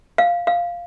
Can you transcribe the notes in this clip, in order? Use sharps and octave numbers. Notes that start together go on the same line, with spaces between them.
F5
F5